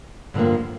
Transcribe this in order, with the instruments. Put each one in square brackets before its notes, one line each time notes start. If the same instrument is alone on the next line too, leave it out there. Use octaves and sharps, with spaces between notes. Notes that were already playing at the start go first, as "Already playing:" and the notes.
[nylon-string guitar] G2 D3 F3 A#3